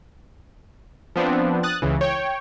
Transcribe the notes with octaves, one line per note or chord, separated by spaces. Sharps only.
F3 B3 C4 D4
D#6 F#6 A6
C#2 C#3 E3
C#5 G5